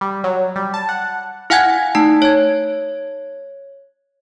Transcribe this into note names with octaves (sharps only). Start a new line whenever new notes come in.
G3
F#3
G3
A5
F#5
E4 F5 F#5 G#5 F#6 G#6
A3 D#4 A5
C#5 G#6